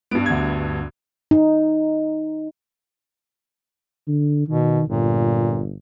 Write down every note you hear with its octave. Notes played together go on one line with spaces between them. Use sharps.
G2 B3 D7
D2 G#6
D#4
D3
B2 D#3
G1 A#2